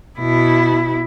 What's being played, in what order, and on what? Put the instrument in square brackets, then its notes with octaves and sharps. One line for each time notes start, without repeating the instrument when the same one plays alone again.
[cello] B2 E4